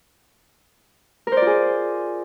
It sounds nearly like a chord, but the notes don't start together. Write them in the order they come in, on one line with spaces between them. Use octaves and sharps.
A#4 C5 D5 F4 G#4